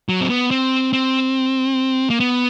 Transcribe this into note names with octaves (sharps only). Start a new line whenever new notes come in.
F#3
C4
B3
C4
C4
A#3
B3